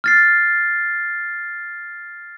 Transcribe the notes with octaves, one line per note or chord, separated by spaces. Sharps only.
F6 A6 C7